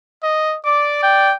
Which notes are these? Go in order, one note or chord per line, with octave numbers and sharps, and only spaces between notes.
D#5
D5 D6
G5